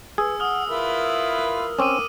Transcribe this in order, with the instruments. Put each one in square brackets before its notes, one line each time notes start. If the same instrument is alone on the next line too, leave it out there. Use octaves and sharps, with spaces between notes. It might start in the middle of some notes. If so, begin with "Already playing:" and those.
[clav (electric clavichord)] G#4 [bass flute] B4 [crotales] E6
[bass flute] F#5 [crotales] D#6 F6
[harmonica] E4 F4 B4 [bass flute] A#4
[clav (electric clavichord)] C4 C#4 [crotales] D6 E6 D#7